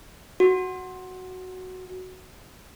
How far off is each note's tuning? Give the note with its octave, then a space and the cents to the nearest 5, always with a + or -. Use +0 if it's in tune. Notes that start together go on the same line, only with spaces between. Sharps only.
F#4 +0